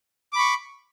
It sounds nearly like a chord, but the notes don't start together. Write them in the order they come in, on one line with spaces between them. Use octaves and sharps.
D6 B5 C#6